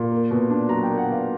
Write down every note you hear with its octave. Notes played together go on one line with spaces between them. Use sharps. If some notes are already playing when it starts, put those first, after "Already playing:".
Already playing: A#2
A#3
B2
D4
F#3 A#5
G5
A#3
F#5
B2 F5